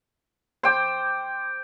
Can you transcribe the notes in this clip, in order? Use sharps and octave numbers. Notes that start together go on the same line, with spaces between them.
C5 G5 D6